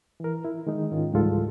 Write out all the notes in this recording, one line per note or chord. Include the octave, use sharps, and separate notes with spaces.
E3 A#4
E4
D#3 G#3 D#4
G#2 D#3 C#4 F4
C#2 G#2 E3 G3 F4 A4